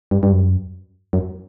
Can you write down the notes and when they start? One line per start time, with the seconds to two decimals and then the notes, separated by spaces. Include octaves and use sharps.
0.11 G2
0.23 G2
0.32 F#2
1.13 F#2